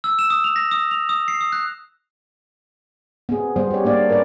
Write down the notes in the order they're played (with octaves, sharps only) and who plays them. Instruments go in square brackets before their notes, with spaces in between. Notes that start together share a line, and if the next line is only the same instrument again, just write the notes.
[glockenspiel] E6
E7
D#6
F7
A#6
D#6
F7
D#6
C7
D#6
F#6
[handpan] B3 C4 G#4
G3 B3 C5
G4 C#5
A#3 D4 D5 F5
A#4 B4 C#5 D5